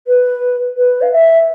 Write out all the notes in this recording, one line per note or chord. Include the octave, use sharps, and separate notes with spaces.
B4
B4
F5
E5